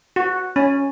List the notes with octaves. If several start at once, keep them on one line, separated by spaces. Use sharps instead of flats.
F#4
C#4